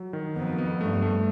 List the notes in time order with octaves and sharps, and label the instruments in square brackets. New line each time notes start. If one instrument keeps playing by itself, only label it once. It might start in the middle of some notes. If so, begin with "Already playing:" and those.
Already playing: [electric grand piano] F#3
D#3
[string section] F2 [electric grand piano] B3
[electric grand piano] B3
[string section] G2 [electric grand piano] A3
[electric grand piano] A3